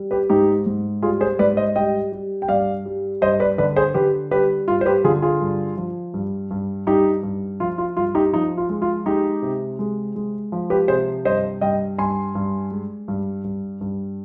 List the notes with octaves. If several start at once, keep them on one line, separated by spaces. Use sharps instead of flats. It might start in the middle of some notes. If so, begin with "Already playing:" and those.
Already playing: G3
G4 B4
G#2 D#4 G4
G#2
G3 F4 G#4
G#4 C5
G#2 B4 D5
C5 D#5
G3 D#5 G5
G3
G5
G2 D5 F5
G3
G2 C5 D#5
B4 D5
D3 B4 D5
G#4 C5
D3 G4 B4
G3 G4 B4
G2 F4
C5
G4 B4
D3 F4 G#4
F4 G#4
G2
F3
G2
G2
G2 D#4 G4
G2
F3 F4
F4
G2 F4
D#4 G4
F3 D#4
F4
G#3
F4
G#3 D#4 G4
C3
G#3
G#3
F3
G4 B4
C3 G#4 C5
G2 C5 D#5
G2 D#5 G5
G2 G#5 C6
G2
G#3
G2
G2
G2